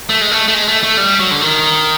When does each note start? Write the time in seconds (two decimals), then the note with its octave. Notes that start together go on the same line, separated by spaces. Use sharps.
0.09 A3
0.21 G#3
0.31 A3
0.48 A3
0.54 G#3
0.68 A3
0.83 A3
0.97 G3
1.19 F#3
1.31 D3
1.41 D#3